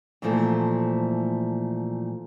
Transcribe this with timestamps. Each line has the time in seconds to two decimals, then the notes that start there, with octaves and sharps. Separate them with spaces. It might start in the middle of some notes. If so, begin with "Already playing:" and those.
0.22 A#2 E3 F3 A3 A#3